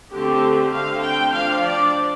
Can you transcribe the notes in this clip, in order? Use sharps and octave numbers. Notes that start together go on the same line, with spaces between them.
D3 A3 C4 G4
D3 A3 C4 F5
G5
F3 D4 F5
D5